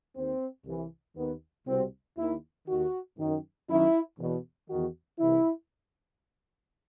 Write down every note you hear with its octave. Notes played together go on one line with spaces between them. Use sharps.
D#2 D#3 C4
C2 C3 E3
D#2 D#3 B3
C2 B2 C4
D#2 D#3 E4
D#2 D#3 F#4
F#2 D#3
F#2 D#3 E4
E2 B2
E2 D#3 F#4
C2 C3 E3 E4